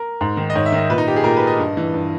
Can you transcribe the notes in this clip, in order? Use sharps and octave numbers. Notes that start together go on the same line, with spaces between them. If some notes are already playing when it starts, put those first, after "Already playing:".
Already playing: A#4
G#2
D#3
D#5
G#2 C#5
E5
D#3
D#5
A#2 B4
D#4
G4
G#4
A#2 A#4
B4
D#5
G2
E3
G2